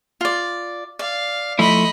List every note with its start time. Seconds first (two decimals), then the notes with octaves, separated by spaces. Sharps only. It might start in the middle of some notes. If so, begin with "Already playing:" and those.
0.21 F4 D5
0.99 D5 F5
1.59 F3 A3 E4 D#5 B5